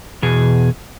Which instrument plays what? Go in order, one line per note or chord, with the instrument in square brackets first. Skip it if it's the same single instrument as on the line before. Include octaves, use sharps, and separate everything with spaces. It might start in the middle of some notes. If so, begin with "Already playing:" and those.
[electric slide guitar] E2 B2 G#4